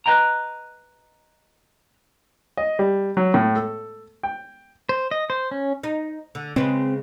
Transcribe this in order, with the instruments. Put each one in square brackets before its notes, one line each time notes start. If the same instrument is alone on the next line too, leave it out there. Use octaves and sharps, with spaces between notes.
[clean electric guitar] B4 C5 D#5 G5 A#5
[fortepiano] D#5
G3
F#3
A2
A4
G5
[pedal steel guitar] C5
D#5
C5
C#4
[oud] D#4
D3
[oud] C#3 G#3 B4 [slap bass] C4